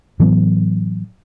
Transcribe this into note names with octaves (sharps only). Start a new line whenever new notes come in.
A2 E3 F#3 B3